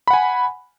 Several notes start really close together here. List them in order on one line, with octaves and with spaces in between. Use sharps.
B5 F#5 G#5